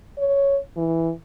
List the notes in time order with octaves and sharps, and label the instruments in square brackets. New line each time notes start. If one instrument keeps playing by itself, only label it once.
[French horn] C#5
E3